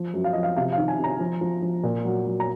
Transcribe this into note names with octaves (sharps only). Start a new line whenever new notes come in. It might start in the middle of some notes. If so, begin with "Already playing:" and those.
Already playing: F3
F#2
F5
F3 D#5
F5
C3 F5
F5
D#3
G#5
C3
A#5
F3
F3
F3
A#2
F#3
F#3
A#5